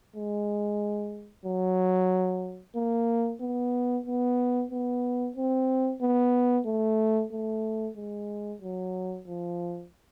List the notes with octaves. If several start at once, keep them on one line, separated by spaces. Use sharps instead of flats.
G#3
F#3
A#3
B3
B3
B3
C4
B3
A3
A3
G#3
F#3
F3